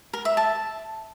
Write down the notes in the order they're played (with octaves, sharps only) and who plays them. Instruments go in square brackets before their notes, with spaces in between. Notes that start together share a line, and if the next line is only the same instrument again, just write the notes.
[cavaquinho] A#4
E5
A5